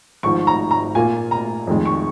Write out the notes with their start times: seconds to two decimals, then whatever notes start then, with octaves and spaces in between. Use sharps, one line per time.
0.23 G#1 G#2 F3 C#6
0.47 A#5
0.71 A#5
0.95 A#2 A#3 F4 G#5
1.31 A#5
1.67 F2 D#3 G#3
1.85 C#6